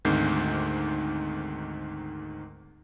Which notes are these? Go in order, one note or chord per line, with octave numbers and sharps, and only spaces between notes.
D2 G#2 D#3 C4 G6 C7